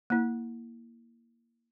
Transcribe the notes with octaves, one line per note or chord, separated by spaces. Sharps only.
A#3 E4